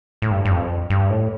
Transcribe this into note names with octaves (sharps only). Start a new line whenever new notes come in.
A2
G2
G2
F2
G2
A2